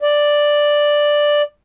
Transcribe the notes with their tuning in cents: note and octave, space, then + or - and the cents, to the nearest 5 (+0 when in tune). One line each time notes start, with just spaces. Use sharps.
D5 +5